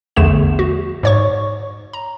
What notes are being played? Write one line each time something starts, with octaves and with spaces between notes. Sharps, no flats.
A#1 E2 D3 A3 E7
F#4
G#2 C#5 C#6
A#5